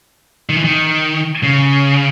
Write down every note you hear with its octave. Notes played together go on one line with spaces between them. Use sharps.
D#3
E3
D#3
C#3